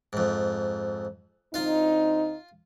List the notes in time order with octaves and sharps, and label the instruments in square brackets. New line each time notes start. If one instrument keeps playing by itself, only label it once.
[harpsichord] F2 G#2
[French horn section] D2 C4 D#4 [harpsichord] F4 F5